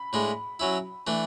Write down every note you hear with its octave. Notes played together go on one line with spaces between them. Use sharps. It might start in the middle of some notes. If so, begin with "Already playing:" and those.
Already playing: B5
A2 G#3 D4
F#3 C#4 E4
E3 A3 D4